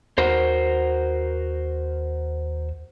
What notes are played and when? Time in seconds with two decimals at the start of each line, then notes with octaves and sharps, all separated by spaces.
0.18 D#2 F#4 A#4 C5